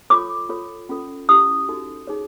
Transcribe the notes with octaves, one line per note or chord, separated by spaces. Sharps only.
F4 A4 C#5 D6
F4 A4 C#5
C#4 F4 A4
C#4 E4 G4 D#6
D#4 F#4 A4
D#4 G#4 C#5